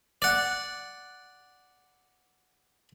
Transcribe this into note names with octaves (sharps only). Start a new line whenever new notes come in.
D5 F#5